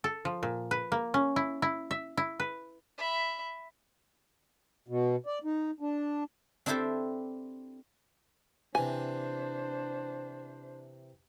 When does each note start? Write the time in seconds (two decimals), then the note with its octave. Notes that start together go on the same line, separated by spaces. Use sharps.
0.04 A4
0.25 F3
0.43 A#2
0.71 B4
0.92 A#3
1.14 C#4
1.36 E4
1.62 E4
1.91 E5
2.17 E4
2.40 B4
2.98 E5 B5
4.88 B2
5.26 D5
5.44 D#4
5.80 D4
6.66 C4 D4 E4 G4 A4 C5
8.75 C3 E3 D4 C5 G#5